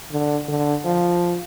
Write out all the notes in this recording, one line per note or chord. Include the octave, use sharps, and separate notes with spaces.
D3
D3
F3